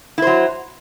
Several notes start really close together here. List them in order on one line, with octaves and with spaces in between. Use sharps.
E4 C5 F#3